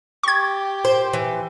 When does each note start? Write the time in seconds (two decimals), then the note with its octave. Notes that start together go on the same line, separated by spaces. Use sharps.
0.23 G4 C#6 G#6
0.85 C5
1.13 E3